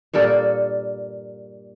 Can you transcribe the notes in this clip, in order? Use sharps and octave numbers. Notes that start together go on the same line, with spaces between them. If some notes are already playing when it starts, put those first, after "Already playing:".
G2 A#2 A#3 A4